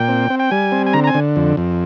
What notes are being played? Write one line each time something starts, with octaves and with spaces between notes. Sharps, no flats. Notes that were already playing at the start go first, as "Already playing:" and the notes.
Already playing: A#2 G5
C4
C4
G5
G3 G#5
C4
G#5
D3 A#5
A#5
G#5
D3
F2
F2